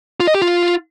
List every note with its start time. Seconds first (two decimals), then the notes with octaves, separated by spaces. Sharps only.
0.20 F4
0.27 D#5
0.35 G4
0.42 F4